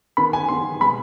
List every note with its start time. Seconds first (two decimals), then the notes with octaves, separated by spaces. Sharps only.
0.17 D#3 B3 B5
0.33 G#5
0.49 D#3 B3 C6
0.80 B2 G#3 B3 B5